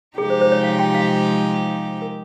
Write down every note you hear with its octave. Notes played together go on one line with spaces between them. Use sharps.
C3 F3 G#3 D#4 G4 G#4
C5
C5
C#5
F5
G5
F5
A#4